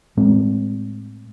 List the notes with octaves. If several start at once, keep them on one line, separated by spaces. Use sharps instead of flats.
A2 G#3 C4